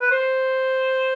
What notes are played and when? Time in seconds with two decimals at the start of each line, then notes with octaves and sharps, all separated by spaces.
0.01 B4
0.11 C5